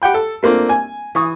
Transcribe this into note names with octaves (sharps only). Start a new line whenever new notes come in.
G4 F#5 G5 B5
A4
A3 A#3 C4 D4 F4
G#5
E3 C#6 D#6